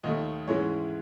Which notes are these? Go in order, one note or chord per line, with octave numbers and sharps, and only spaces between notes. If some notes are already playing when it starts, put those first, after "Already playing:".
D#2 D#3 A3 D#5
G#2 E3 G#3 C#4 E4 C#5